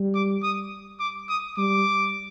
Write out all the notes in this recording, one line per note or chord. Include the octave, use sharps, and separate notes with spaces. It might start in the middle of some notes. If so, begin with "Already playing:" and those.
Already playing: G3
D6
D#6
D6
D#6
G3 D6